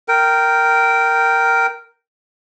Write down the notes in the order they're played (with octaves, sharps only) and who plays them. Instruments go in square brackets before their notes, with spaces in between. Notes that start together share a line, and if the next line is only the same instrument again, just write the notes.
[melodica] A#4 G5